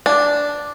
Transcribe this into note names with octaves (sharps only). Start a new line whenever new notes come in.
D4